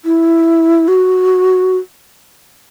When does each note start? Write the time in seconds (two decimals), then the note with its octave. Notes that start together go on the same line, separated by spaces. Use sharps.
0.05 E4
0.88 F#4